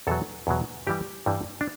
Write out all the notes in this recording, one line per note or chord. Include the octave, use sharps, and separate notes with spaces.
E2 B2 F#3 A4
E2 B2 F#3
G2 E3 G3 G4
G2 E3 G3
D4